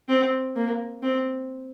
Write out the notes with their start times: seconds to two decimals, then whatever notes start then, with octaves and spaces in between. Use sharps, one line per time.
0.09 C4
0.55 A#3
1.02 C4